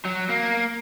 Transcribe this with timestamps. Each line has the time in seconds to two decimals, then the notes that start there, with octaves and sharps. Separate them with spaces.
0.05 F#3
0.29 A#3